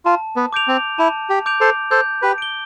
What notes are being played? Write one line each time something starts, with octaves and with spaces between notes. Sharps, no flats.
F4 A5
B3
D6 G6 D7 F7
C4
E4 A5
G4
D6 G6 D7 F7
A4 C5
A4 C5 G6
G4 B4
D7 G7